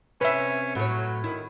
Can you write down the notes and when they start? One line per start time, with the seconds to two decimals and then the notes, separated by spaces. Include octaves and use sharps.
0.21 C3 C#4 B4 E5
0.75 A2 F#3 C#5
1.24 D#3 E4